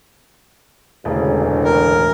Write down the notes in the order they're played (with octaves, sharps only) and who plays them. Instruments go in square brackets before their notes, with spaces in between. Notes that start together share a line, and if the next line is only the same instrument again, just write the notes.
[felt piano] E1 C#3 [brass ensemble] A1 D2
[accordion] A#4